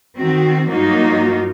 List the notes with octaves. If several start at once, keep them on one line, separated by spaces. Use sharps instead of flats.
D#3 C4 F#4
G2 F#3 A#3 D#4 F4 F#4